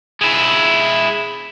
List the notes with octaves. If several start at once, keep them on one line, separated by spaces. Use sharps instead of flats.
G#3 E4